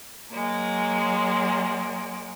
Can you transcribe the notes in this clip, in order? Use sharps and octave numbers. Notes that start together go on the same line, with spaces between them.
F#3 G#3 A#3